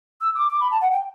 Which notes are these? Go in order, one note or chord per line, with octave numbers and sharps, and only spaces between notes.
E6
D6
D6
B5
A5
F#5
G5